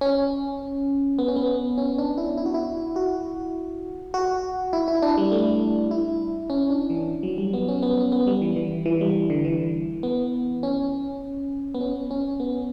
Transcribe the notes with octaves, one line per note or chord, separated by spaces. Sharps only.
C#4
B3
C#4
B3
C#4
D4
E4
E4
F#4
E4
F#4
F#4
E4
E4
D4
G3
A3
E4
C#4
D4
E3
F#3
G3
B3
C#4
B3
C#4
B3
G3
E3
E3
E3
G3
D3
E3
B3
C#4
B3
C#4
C#4
B3